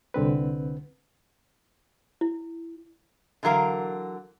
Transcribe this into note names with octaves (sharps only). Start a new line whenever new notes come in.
C2 D3 C4 B4
E4
D3 E3 F#3 A#4 F5